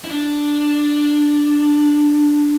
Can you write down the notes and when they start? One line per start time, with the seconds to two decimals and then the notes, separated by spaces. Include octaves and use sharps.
0.05 E4
0.11 D4